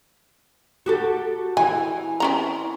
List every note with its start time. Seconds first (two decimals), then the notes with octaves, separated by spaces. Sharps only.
0.86 F#4 G4 A4
1.57 E3 E4 G#5
2.20 C4 C#4 A#5